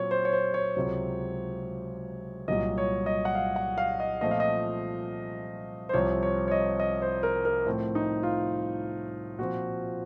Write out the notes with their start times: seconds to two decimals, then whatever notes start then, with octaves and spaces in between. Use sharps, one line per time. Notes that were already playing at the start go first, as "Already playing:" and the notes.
Already playing: A#2 F#3 C4 C#5
0.11 C5
0.25 C#5
0.33 C5
0.54 C#5
0.76 C#2 C3 F#3 C4
2.48 C2 A#2 F#3 D#5
2.78 C#5
3.06 D#5
3.25 F#5
3.35 F5
3.56 F#5
3.78 F5
4.00 D#5
4.21 A#2 F3 A3 C4 D#5
4.31 F5
4.40 D#5
5.89 C5
5.93 C2 C3 F3 C4 C#5
6.23 C#5
6.48 C#5
6.51 D#5
6.80 D#5
7.02 C5
7.23 A#4
7.45 A#4
7.66 A2 F3 A3 C4
7.95 D#4
8.23 F4
9.39 A#2 F3 C4 F#4